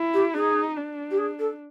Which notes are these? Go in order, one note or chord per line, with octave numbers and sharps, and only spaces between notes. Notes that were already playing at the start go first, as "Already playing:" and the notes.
Already playing: E4
G4
D#4 G#4
D4
G4
G#4
A4